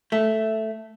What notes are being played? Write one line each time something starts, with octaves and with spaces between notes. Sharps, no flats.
A3